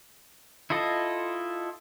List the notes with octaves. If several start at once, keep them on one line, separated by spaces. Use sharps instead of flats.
E4 F4 A4 D#5